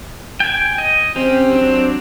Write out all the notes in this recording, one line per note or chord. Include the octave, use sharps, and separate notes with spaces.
G5 G#5
D#5
C4 C#4 G4
F#3 D4